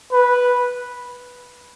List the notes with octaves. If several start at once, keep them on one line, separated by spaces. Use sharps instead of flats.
B4